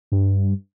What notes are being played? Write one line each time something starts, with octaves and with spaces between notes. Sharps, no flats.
G2